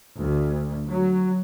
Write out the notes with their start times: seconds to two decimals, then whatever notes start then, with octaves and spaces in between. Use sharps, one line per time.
0.18 D2
0.88 F#3